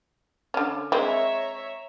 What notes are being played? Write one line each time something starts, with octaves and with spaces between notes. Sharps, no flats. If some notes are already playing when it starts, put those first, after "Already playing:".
D3 C#4
G#3 C4 C#5 E5 A#5